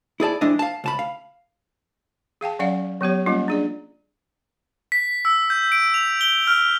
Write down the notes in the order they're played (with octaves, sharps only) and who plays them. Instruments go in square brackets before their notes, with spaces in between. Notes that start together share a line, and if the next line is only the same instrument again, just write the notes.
[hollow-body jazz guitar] E4 G#4 D5 A5
F2 G#3 D4 E4 D#5
F5 A5
C#2 A5 B5
F5
[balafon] G#4 F5 G5 A5
F#3 C#4 D5 F5 F#5
F#3 B3 G4 C#5
G3 A#3 C#4 F4
D4 G#4 D5
[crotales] B6
E6
G6
D7
F7
G7
F6